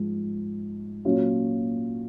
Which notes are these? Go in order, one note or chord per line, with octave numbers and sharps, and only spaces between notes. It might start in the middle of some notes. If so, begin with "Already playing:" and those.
Already playing: G#2 F3 G#3
A#2 F#3 C#4 F4